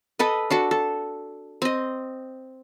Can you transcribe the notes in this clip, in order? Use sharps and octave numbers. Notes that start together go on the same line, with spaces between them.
A4 B4 D#5
D4 F#4 A4
A4
C4 D#5